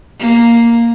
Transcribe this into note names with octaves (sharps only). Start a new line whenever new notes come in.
A#3